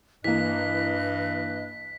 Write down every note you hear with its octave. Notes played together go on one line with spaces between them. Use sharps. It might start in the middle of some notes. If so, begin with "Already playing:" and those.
G2 E3 A#3 B4 D#5 F#6 B6